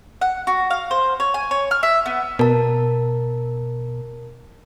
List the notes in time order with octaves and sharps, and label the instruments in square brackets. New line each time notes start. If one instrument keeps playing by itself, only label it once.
[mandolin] F#5
F#4
F5
C5
C#5
G#5
C#5
F6
E5
B3
[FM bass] B2 [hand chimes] A#4 A5